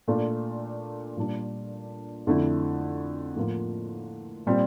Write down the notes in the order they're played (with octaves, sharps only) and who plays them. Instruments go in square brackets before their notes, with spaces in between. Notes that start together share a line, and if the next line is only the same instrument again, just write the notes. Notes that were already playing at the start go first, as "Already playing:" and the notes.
[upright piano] A#2 A3 D4 F4
A#2 G3 D4 F4
F2 D3 A3 E4
A2 F3 A#3 F4
A#2 G3 C4